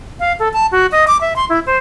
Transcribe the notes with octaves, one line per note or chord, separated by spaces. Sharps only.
F5
A4
A5
F#4
D#5
D6
E5
C6
E4
C5